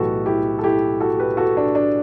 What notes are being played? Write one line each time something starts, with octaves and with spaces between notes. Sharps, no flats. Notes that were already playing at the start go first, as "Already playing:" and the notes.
Already playing: B1 A2 E3 F#4 G4 A4 B4
E4 G4
A4
E4 G4
F#4 A4
G4 B4
F#4 A4
D4
D4